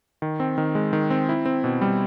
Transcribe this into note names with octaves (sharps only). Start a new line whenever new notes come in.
D#3
C4
D#3
G#3
D#3
C4
E4
C4
B2
G3